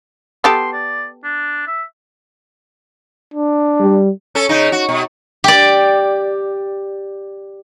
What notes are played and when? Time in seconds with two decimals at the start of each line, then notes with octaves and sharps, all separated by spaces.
0.44 B3 G4 A4 C6
0.73 D5
1.24 D4
1.67 E5
3.34 D4
3.81 G3
4.35 C#4 A4
4.49 C#3 D#4
4.72 F#4
4.89 B2
5.44 G4 D5